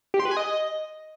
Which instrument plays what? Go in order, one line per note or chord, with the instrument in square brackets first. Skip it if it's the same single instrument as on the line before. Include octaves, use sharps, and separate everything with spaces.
[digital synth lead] G4
C6
B4
G#5
D#5